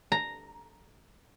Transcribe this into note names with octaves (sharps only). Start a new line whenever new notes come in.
A#5